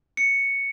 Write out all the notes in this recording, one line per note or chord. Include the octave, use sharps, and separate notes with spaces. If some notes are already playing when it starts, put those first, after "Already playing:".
C#7